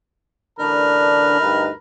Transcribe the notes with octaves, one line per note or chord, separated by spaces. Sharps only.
A1 D3 D4 A#4 B4
D2 G2 D#4